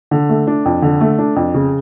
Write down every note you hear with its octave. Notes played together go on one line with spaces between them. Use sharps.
D3
A3
D4
F2
D3
A3
D4
F2
C#3